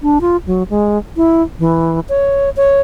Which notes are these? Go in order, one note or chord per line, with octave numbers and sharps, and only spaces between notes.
D4
F4
F#3
G#3
E4
E3
C#5
C#5